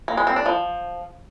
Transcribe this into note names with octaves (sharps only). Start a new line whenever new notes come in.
A#3
G#3
C4
D4
F3